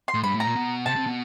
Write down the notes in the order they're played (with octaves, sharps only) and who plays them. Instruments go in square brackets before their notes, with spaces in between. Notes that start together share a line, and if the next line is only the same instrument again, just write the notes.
[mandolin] C6
[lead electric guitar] A2
[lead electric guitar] G2 [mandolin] B5
[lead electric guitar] A2
[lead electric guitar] A#2 [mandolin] A#5
[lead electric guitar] B2
[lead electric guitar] C3 [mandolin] A5
[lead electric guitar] C3
B2